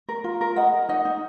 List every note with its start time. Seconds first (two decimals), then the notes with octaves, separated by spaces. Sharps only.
0.09 A#4
0.24 F4
0.41 A#4
0.56 A#4 D#5 F#5
0.74 A#4
0.89 D#4 D#5 F#5
1.05 D#4